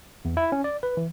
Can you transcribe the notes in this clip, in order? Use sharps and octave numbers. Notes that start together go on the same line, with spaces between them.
E2
E4
C#4
D5
B4
E3